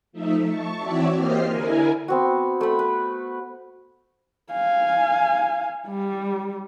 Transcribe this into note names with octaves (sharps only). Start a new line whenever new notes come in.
F3 A3 D#4 E5
A5 C#6
E3 C4 F#4 C#5 D5 E5
A#3 G4 C5 D#5 F6 C7
D3 E4 A#4 G#5
B3 C4 F#4
A3 B5
B4
F5 G#5
G3